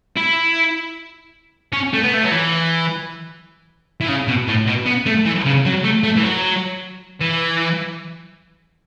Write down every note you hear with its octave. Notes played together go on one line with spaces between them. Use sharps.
E4
C#4
A3
B3
A3
F#3
E3
E3
C#3
B2
A2
B2
B3
A3
E3
C#3
F#3
A3
A3
E3
F#3
E3